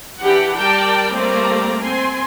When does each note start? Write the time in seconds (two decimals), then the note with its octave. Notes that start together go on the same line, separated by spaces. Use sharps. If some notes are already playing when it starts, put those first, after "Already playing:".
0.19 E3 D4 G4 F#5
0.55 G3 A#4 D5 G5 A5 A#5
1.12 G3 A3 A#3 C4 D5 A#5
1.81 C4 G#5 C6